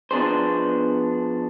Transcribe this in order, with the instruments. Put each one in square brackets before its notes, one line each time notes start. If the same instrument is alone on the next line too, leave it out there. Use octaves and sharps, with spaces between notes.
[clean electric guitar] F3 B3 D4 G#4 C5